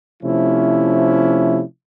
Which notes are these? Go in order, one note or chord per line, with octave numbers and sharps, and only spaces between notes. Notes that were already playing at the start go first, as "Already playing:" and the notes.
C3 F3 A3 C#4 E4